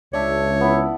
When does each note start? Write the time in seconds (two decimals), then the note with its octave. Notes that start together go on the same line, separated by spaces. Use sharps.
0.13 C#2 D4 C#5 E5
0.61 B3 E4